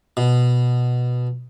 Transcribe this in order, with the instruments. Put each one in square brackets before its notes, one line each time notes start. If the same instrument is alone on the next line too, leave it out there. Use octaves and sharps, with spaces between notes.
[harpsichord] B2